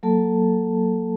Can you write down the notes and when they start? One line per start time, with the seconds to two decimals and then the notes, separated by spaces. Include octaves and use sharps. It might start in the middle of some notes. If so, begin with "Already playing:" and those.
0.03 F#3 A#3 A4 A5